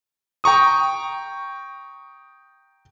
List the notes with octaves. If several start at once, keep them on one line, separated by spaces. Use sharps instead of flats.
G5 A#5 C#6 D#6